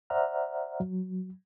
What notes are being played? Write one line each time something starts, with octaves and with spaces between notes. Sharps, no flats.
C5 D5 E5 F#5 A#5 F6
F#3